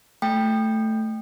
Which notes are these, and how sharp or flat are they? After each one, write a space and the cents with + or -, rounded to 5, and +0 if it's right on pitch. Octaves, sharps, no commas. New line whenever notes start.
A3 +0 G5 +10